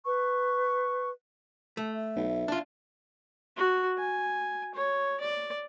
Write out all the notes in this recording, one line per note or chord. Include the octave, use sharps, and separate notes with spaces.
B4 C#6
A3
E5
B1
D4 F4
F#4
G#5
C#5
D5